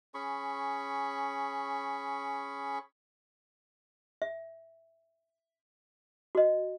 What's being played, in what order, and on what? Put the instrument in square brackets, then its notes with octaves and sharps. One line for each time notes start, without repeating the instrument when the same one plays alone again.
[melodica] C#4 G#4 B5 C#6
[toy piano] E5
F#4 D#5